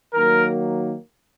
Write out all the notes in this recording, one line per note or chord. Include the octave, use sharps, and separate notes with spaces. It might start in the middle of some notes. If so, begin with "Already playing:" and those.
D#3 F#3 A#3 A#4